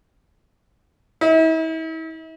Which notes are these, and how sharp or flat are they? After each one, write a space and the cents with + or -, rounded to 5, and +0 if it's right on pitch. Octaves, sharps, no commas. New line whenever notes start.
E4 -40